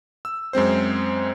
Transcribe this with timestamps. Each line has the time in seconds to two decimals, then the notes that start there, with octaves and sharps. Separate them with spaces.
0.25 E6
0.53 F#2 G#3 C4 C5